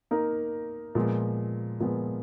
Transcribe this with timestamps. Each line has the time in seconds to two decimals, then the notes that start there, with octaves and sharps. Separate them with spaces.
0.11 A#3 D#4 A#4
0.95 A#2 F3 G#3 B3
1.80 A#2 F3 G#3 B3